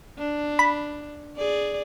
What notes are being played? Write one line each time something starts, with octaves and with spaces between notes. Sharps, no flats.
D4
B5
G#4 D5